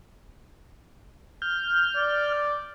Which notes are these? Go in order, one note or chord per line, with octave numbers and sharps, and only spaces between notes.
F6 G6
D5